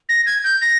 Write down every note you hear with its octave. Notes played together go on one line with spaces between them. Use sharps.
A#6
G#6
G6
A#6